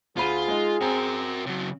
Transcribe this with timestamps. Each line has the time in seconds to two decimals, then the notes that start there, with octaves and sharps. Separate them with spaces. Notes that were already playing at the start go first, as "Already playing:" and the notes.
0.17 D2 F4 G#4 B5 D#7
0.48 G#3 D#4
0.81 C4 F#4 A#4
1.46 C#3 F#3